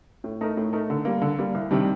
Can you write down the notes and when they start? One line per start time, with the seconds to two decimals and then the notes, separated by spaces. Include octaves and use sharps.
0.24 A2
0.41 A3 D#4 A#4
0.57 A2
0.73 A3 D#4 A#4
0.90 D3
1.05 G3 A#3
1.22 D3
1.39 G3 A#3
1.55 C2
1.71 C3 D#3 G3 D4